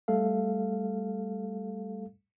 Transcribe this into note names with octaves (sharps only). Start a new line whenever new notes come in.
G3 A3 A4 F5